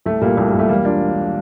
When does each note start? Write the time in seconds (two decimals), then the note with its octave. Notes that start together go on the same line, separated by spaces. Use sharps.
0.06 C2 A3
0.21 A#2 G3 A#3
0.37 C2 A3
0.49 G3
0.54 A#2
0.59 A3
0.69 E1 G3 A#3
0.85 D4 F4